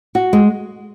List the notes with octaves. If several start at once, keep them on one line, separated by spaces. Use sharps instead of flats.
F#4
G#3